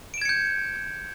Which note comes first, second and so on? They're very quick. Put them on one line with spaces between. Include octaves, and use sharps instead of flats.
D7 E7 G#6 C#7 G6